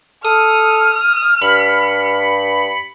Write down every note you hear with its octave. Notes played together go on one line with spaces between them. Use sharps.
A4 D#6 F6
G2 B5 C#7